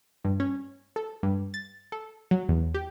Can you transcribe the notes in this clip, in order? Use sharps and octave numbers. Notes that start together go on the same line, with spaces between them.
G2
C#4
A4
G2
A6
A4
F#3
E2
G4